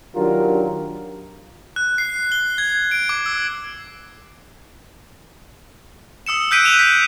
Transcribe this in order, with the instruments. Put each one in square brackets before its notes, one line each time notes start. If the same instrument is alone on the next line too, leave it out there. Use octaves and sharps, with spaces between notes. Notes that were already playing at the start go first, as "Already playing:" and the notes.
[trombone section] D#3 F#3 D4 F4 G4 A#4
[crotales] F#6
C7
G7
G#6
D7
D6
E6
D#6 E6 C#7 E7
E6 F#6 G6 B6 D7 D#7
F#6 E7 F7 G7
B6